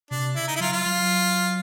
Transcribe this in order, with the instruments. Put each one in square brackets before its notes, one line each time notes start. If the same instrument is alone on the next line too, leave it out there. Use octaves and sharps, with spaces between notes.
[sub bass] C3 [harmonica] D4
[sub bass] C#3 [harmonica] E4
[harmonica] D#4
E4
[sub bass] F#3 [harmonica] F4
[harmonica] F4
[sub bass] F#3